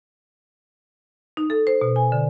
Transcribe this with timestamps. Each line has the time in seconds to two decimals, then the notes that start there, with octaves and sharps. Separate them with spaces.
1.37 D#4
1.50 A4
1.67 C5
1.81 B2
1.96 G#5
2.12 D3